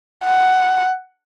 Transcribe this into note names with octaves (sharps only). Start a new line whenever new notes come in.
F#5